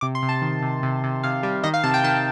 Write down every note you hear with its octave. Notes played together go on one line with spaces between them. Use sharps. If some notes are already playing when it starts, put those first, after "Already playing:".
C3 D6
C6
C3
A5
D#3
C3
C3
C3
C3 F5
G3
D#3 D#5
F5
C3 A5
G5
D#3 A5